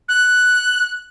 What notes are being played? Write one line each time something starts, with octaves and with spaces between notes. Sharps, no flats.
F#6